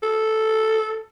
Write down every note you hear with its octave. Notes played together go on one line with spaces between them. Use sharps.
A4